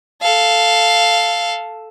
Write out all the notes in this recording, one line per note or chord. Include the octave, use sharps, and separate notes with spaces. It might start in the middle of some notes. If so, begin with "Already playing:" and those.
A4 F5